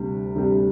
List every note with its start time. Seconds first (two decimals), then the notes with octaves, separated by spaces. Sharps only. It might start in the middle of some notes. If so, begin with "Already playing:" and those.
Already playing: D2 C3 G3
0.35 D2 C3 G3